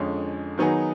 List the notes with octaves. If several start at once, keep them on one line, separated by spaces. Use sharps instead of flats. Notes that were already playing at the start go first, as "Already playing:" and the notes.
Already playing: F2 D3 F3 G#3 C#4
D#3 F#3 B3 D#4 G#4